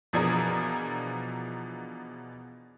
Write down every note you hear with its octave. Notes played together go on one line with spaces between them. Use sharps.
B2 E3 F3 D4 G#4 A#4